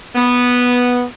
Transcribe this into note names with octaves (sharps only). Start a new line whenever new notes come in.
B3